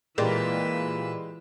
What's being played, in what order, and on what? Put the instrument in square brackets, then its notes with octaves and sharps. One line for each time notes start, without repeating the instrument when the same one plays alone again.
[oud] A#2 [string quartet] E3 B4 E6 [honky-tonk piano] G#3 G4 D5